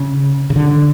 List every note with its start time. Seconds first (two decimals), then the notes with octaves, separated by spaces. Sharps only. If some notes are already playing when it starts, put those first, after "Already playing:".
Already playing: C#3
0.50 C#3
0.56 D3